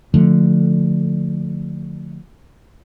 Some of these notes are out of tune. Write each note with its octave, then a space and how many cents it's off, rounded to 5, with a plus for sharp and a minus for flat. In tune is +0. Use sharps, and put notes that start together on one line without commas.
D3 +0 F3 +25 A3 +15